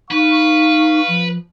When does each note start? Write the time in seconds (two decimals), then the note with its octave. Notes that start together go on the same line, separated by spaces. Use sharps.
0.11 D#4 B4 F5 C#6
1.08 F3